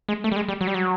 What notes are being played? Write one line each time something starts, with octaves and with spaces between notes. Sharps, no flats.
G#3
A3
G3
G#3
G3
F#3
G3
F#3